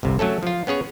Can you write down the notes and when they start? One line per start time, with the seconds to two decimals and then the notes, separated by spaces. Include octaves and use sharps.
0.03 G1 C2 C3
0.19 F#3 A3 C#4 A4
0.43 F3 F4
0.67 B3 C#4 G#4 C#5